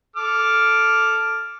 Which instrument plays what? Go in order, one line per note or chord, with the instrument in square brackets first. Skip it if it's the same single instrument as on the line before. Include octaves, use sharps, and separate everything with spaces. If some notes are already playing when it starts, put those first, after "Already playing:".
[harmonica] A4 D6 F6